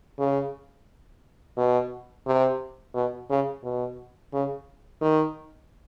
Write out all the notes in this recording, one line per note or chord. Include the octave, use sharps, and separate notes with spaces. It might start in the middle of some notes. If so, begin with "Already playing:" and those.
C#3
B2
C3
B2
C#3
B2
C#3
D#3